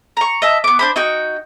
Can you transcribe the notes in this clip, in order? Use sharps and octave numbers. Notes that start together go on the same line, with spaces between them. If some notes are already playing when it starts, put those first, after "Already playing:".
A#5 C#6
D#5 E5 A5
B3 D6
D4 C5 B5
D#4 F#4 G5